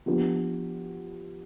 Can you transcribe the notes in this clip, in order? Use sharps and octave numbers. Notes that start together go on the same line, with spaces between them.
F3 B3 D4 G4